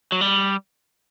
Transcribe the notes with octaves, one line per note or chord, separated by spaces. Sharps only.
F#3
G3